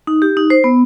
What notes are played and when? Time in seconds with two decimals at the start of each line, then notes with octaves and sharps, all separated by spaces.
0.07 D#4
0.22 G4
0.37 D#4
0.50 C5
0.64 B3